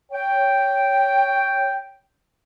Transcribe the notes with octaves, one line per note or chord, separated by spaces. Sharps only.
C#5 G5